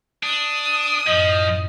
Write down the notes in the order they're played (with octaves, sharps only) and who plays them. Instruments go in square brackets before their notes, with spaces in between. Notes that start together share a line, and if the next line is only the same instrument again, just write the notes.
[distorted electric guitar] D4 [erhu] D#6
[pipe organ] F#2 A2 [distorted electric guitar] F3 [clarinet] D#5